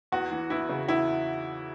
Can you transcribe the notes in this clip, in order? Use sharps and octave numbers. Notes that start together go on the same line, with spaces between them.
E2 F#4
E3
E2 E4
C#3
E2 E4